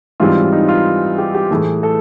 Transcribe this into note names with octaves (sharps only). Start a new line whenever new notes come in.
G#2 E3 G3 C4 F4
D#4
F4
G4
G4
A2 E3 A3 G#4
A4